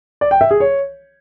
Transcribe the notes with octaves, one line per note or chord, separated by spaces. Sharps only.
D5
G5
E5
G#4
C#5